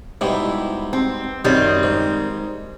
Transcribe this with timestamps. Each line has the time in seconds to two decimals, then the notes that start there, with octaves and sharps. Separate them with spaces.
0.21 G#2 B2 G3 E4
0.93 C4
1.45 F#2 D#3 G3 C4
1.83 G#2